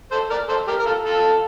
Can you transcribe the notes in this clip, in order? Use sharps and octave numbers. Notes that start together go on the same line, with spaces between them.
A4 C5
A#4 D5
A4 C5
G4 A#4
A#4
F4 A4
F4 A4